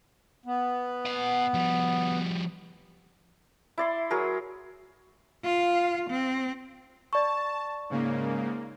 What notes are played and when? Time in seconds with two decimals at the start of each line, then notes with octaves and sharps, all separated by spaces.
0.46 B3
1.05 D#5 F#5
1.54 F3 G3
3.78 E4 D5 C6
4.11 F#3 G#4 A#4
5.43 F4 F5
6.10 C4
7.13 D5 A5 C#6
7.90 G#2 C#3 A#3